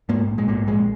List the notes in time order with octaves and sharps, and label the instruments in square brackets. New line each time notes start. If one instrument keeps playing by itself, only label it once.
[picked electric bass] G#2 A#3
A#1
G#3
G#2 A#3
A#1 G#3